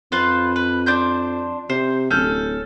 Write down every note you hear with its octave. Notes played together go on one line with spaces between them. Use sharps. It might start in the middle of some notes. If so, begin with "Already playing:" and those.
F2 F4 B4 C5
B4
D4 C5 G6
C3 C5
D1 C#4 A4 G6